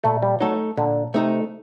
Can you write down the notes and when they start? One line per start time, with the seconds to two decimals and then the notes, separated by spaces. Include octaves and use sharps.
0.04 A#2 A3
0.22 G3
0.40 F#3 A3 D#4 A4
0.77 A#2 D3
1.14 C3 A3 D#4 A4